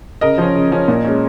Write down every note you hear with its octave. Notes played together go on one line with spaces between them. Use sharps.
C#3 A#4 D#5
F3 C#4
C#3
F3 C#4
A#2
G#3 C#4